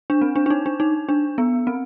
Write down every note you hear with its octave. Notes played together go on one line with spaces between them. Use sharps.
D4
C4
D4
D4
D#4
D4
D#4
D4
B3
C4